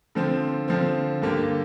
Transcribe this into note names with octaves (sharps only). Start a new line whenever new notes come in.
D3 F3 C4
D3 F3 C4
G2 D3 A#3 G4